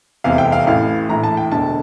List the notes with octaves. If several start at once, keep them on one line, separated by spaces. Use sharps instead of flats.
F1 E2 C3 F5
G5
F5
A1 A2 E3 F5
A#1 A2 E3 A#5
A5
G5
E1 D2 D3 A5